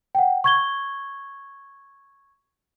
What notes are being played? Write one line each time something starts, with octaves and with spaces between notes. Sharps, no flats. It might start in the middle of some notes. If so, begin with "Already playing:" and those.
F#5 G5
C#6 G#6 G7